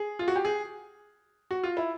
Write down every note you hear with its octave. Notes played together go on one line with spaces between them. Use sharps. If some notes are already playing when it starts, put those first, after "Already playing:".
Already playing: G#4
F4
F#4
G4
G#4
F#4
F4
E4